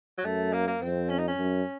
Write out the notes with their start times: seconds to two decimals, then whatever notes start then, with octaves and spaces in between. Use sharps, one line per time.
0.18 F#3
0.25 F#2 A3
0.53 A#3
0.68 A#3
0.81 F2 C4
1.09 C#4
1.18 D#4
1.28 C#4
1.37 F#2